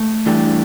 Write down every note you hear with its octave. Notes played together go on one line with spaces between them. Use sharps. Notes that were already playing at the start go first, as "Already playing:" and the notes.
Already playing: A3
G2 E3 A3 D4 G4